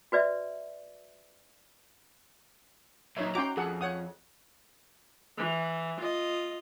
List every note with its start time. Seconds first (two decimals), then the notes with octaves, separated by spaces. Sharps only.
0.12 F#4 B4 D5 E5
3.17 A#2 F#3 D#4 C#5 E5
3.35 C#4 F#4 G5 A#5 C6 D6
3.57 F2 G#4 A4 F#5
3.81 C#5 F#5 D#6
5.38 E3
6.00 F4 D#5